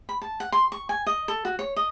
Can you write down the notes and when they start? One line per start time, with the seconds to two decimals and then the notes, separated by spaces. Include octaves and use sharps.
0.09 B5
0.22 A5
0.40 F#5
0.52 C6
0.72 C#6
0.89 G#5
1.06 D#5
1.28 A4
1.45 F#4
1.59 C#5
1.76 D#5